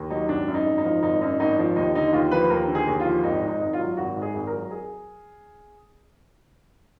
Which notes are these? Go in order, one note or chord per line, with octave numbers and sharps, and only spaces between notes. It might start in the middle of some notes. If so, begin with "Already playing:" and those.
Already playing: D#2
F#3 D#4
G#1 D4
F#2
D#4
G#1
D#4
F3
G#1 D#4
F#2 D#4
G#1 D#4
F3
D#2 D#4
D3 D#4
D#2 F4
F3 B4
D#2 A#4
D3
G#4
D#2
F4
F3
G#1 D#4
G#2
D#4
G#1
F4
F#3
G#1 F#4
G#2
G#4
G#1
A#4
F#3
G#4